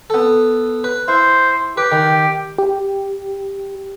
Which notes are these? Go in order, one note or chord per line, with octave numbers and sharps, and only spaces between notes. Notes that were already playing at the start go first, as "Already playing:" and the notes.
B3 A4
B4
E4 C5
G4 B4
D#3
G4